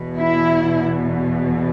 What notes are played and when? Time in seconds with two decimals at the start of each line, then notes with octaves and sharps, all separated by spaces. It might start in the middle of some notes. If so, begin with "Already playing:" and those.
Already playing: E2 B2
0.17 E4